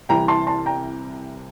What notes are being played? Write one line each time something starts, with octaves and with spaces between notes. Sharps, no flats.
C2 C3 E3 G5 A#5
A5 C6
A5 C6
G5 A#5